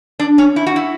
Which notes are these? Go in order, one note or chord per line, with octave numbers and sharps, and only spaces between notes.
D4
C#4
E4
F#4
E4